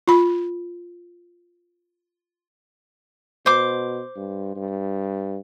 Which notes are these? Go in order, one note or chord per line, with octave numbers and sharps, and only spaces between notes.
F4 B5
B2 C5 D6
G2
G2